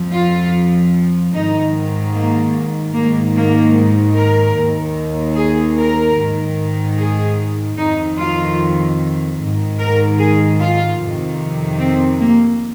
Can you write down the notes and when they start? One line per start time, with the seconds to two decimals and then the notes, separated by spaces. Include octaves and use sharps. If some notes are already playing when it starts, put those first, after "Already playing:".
Already playing: F2 F3
0.13 F4
1.33 G#2 D#3 D#4
2.14 A#3
2.93 G#2 A#3
2.99 D#3
3.34 A#3
4.14 A#4
4.55 D#2 D#3
5.35 G#4
5.76 A#4
6.16 G#2 D#3
6.96 G#4
7.76 F2 D#3 D#4
8.17 F4
9.37 G#2 D#3
9.78 A#4
10.19 G#4
10.58 F4
10.98 F2 C3 D#3
11.79 C4
12.19 A#3